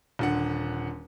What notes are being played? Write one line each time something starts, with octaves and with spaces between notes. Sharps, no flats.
D#1 D3 F#5